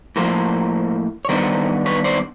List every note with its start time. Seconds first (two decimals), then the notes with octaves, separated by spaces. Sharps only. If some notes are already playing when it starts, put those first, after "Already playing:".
0.16 A2 F3 A#3 A#4 C5
1.25 C#5
1.29 D#3 G3 B3 D4 A#4 C5
1.86 B4 C#5
2.04 C5 D5